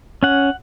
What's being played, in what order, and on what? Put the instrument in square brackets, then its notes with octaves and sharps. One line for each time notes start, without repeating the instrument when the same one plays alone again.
[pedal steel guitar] C#4 F#5